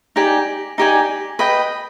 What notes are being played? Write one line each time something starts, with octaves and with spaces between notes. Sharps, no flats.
D#4 G4 D5 G#5
D#4 G4 D5 G#5
B4 D#5 G5